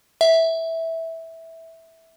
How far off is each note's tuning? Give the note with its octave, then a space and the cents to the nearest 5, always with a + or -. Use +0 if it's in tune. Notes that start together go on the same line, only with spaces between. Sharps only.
E5 -10